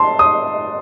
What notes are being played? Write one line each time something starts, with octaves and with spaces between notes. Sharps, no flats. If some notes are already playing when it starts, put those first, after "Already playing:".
Already playing: A5 C6
D#6